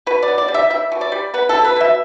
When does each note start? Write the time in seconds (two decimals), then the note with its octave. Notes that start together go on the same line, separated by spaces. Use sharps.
0.06 B2 B4
0.23 D5
0.28 B3
0.38 D5
0.48 G3
0.54 E5
0.70 G3 E5
0.92 B2
1.01 D5
1.12 G3
1.34 B3 B4
1.49 A4
1.54 B2
1.64 B4
1.76 B2 E5